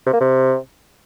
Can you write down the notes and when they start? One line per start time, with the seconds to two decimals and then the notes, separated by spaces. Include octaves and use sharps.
0.06 C3
0.13 A#3
0.20 C3